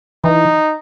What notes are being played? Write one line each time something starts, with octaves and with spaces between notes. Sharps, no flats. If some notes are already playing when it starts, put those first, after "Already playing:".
E3 D#4